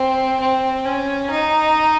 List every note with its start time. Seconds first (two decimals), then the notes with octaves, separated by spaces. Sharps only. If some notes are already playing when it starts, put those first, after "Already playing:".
Already playing: C4
0.40 C4
0.85 C#4
1.30 D#4